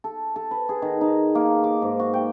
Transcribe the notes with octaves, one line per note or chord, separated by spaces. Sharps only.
A4
A4
B4
G#4
D#3
D#4
A#3
D6
G#2
F#4
G5